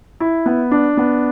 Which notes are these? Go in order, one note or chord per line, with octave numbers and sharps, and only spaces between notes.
E4
B3
D4
B3